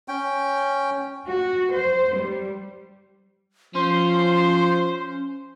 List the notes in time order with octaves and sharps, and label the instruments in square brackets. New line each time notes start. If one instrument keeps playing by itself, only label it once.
[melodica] C#4 G5
[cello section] F#4
C5
G3
[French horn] F3 [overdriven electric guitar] C#4 [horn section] C5 [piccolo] C6